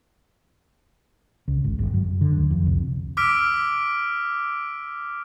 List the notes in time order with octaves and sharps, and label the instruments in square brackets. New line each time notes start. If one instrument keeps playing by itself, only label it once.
[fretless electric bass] C#2
G#1
G1
F#2
D3
D2
F2
C2
[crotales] D6 E6 F6 B6 D7